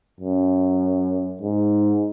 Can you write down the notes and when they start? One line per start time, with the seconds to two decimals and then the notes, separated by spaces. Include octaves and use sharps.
0.20 F#2
1.41 G#2